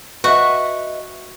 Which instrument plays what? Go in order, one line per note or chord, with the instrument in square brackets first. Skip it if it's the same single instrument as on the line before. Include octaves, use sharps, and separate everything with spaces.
[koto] F#4 [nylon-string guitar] B4 D#5 E5